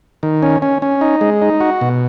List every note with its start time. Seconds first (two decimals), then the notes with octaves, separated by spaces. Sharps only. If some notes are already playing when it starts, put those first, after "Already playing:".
0.23 D#3
0.43 C#4
0.62 C#4
0.82 C#4
1.01 D#4
1.21 G#3
1.41 D#4
1.60 F#4
1.81 B2